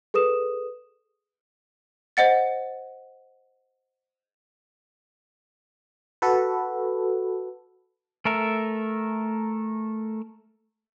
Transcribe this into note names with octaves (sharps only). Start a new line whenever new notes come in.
G#4 A4 B4 D#6 E7
C5 D#5 F#5 A6
F#4 A4 B4
A3 A4 A#4 E5